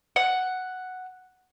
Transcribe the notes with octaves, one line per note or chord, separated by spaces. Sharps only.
F#5